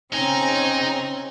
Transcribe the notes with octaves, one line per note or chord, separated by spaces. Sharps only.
C#3 C4 C#4 D#4 G#5 A#5